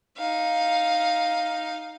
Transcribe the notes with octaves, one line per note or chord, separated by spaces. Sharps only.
D#4 F5